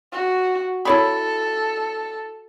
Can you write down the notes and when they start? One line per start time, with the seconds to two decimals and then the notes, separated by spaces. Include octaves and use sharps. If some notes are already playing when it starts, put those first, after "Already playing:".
0.12 F#4
0.85 E4 A4 C#5 B5